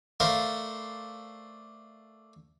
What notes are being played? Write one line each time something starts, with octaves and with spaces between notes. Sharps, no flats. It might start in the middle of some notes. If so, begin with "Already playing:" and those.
A3 D4 A#4 C5 F5